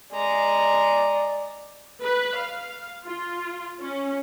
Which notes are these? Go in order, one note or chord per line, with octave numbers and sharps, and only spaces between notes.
G#3 D5 A#5
B4
F5
F4
C#4